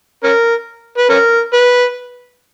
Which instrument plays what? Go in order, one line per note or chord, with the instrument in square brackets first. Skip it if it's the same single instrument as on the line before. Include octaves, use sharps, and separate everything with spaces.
[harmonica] C#4 A#4
B4
C#4 A#4
B4